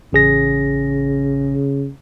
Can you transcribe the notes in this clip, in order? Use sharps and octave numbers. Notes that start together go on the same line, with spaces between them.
A1 C#3 G#4 A#6